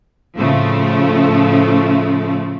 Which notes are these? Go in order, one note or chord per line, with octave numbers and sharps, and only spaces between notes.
A2 C#3 F3 A3